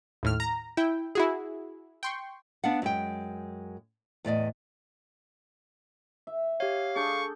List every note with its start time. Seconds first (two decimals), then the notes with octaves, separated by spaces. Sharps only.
0.23 D#2 A2 F6
0.40 A#5
0.77 E4 G5
1.15 E4 F#4 G#4
2.03 G5 C6 C#6
2.64 B3 D4 F5 F#5
2.82 F#2 G#3 G5
4.25 E2 A2 D5 D#5
6.27 E5
6.60 G4 C#5 F5
6.96 D4 G#4 A4 C#6 G6